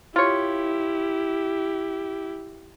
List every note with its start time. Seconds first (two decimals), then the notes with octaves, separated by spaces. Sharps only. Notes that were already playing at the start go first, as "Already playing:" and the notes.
0.16 E4 F4 G4 C#5